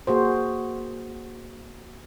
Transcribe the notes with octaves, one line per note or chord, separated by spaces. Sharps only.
A#3 F#4 G#4 C5